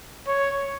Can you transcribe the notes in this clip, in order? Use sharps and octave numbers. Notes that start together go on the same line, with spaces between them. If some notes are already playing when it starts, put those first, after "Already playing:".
C#5